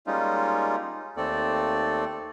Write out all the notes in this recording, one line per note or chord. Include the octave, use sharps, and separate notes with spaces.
G3 G#3 A#3 C#4 D#4 F4
D#2 A3 C4 A4 D5